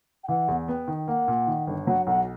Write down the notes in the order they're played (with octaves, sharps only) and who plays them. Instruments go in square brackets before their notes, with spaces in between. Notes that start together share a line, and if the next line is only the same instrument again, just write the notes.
[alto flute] G5
[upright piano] E3 [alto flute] F#5
[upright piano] E2
[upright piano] B3 [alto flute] G5
[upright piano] D#3
[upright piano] A#3 [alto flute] F#5
[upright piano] A#2
D#3
G1
[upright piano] F#3 [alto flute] F#5
[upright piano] B1 [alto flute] F#5